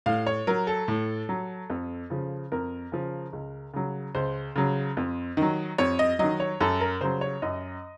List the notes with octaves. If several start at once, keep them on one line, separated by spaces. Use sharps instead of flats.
A2 F5
C#5
F#3 A#4
A4
A2
F#3
F2
C#3 F3
F2 A#4
C#3 F3
C#2
C#3 F#3
C#2 C5
C#3 F#3
F2
D#3 F#3
F2 C#5
D#5
D#3 F#3 D#5
C#5
F#2 A4
A#4
C#3 F#3 C5
C#5
F#2 D#5